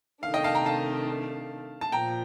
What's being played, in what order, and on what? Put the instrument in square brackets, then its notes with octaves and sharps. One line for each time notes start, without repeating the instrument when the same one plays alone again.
[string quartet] C3 D#3 A3 D4 [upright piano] F5
[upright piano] D#5 G5
F5 A5
G5 A#5
F5 A5
A5
[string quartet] A#2 F3 [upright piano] G5 A#5